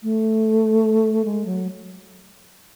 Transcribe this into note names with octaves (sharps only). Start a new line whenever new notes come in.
A3
G#3
F#3